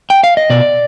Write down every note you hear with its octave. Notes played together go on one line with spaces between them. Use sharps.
G5
F5
D#5
B2 D5